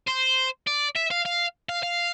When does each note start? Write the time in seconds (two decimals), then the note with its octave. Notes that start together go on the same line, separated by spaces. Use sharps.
0.08 C5
0.67 D5
0.95 E5
1.10 F5
1.25 F5
1.69 F5
1.83 F5